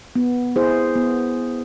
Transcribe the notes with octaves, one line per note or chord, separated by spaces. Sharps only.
B3
E4 G#4 C5
B3